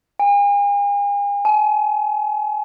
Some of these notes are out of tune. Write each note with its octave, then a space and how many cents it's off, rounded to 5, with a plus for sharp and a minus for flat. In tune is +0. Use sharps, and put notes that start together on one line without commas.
G#5 -45
G#5 +40